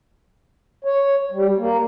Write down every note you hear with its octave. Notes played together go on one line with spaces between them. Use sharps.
C#5
G3
A#3